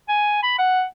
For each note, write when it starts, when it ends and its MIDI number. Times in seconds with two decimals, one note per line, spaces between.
0.08 0.38 80
0.43 0.59 83
0.59 0.84 78